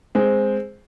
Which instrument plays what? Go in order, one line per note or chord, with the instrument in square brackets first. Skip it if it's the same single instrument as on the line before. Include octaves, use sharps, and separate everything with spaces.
[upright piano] G#3 C4